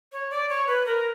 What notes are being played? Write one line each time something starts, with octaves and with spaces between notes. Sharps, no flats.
C#5
D5
C#5
B4
A#4